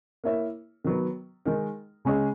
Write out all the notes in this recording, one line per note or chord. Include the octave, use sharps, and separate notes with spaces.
A#3 E4 A#4 C#5 E5
D#3 F#3 B3
D#3 G#3 D#4 A#4
C#3 G#3 C#4 G#4 D#5